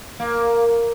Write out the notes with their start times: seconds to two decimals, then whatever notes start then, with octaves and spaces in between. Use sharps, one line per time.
0.20 A#3